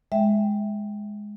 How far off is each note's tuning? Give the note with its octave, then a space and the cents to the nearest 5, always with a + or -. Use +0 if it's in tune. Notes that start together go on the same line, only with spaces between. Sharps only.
G#3 +0 E5 +0 G5 +0